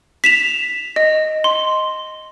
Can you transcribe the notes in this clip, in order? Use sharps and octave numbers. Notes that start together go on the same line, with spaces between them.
B6 E7 F7
D#5
C6